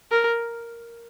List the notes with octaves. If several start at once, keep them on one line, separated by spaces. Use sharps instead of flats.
A#4